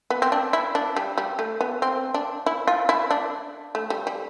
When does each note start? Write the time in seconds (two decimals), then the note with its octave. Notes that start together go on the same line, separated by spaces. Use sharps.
0.10 B3
0.22 C4
0.32 D4
0.53 E4
0.75 D4
0.96 G3
1.18 G3
1.39 A3
1.61 B3
1.82 C4
2.14 D4
2.46 E4
2.67 F4
2.89 E4
3.11 D4
3.75 A3
3.90 G3
4.07 G3